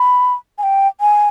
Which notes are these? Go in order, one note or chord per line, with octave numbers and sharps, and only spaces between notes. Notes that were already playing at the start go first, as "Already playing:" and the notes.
Already playing: B5
G#5
G5
G#5